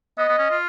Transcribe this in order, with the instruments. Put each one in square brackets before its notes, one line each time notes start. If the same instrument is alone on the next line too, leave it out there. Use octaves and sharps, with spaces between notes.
[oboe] B3 [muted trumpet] D#5
[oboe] B3
C#4
F4